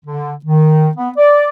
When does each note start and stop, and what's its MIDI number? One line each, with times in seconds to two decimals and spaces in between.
0.05 0.33 50
0.44 0.89 51
0.96 1.09 59
1.17 1.48 74